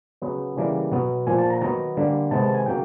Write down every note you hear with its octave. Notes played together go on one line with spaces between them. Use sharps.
C#3 F#3 B3
C#3 E3 G3 A#3
B2 F#3 B3
A#2 F3 A#3 G#5
A5
A#5
D#3 F#3 B3 A#5
D3 G3 A#3
C3 D#3 G#3 B3 A5
A5
G#5
C#3 F#3 A#3 G5